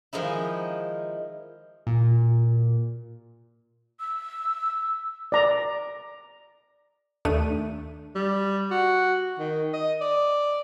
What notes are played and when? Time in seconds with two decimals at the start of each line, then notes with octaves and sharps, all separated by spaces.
0.13 D#3 F3 G#3 D#4 E4
1.87 A#2
4.00 E6
5.32 D5 A#5
7.25 D#2 A3 D4 D#7
8.15 G3
8.71 F#4
9.39 D#3
9.73 D#5
10.01 D5